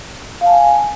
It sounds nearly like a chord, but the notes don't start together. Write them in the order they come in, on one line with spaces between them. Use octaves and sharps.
F5 A5 G#5